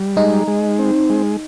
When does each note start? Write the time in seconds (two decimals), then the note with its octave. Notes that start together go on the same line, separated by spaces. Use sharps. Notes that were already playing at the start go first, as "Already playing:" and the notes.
Already playing: G3
0.16 G#3 D#4
0.47 G#3
0.79 C4
1.10 G#3